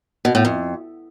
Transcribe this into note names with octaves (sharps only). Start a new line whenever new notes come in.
B2
A2
F2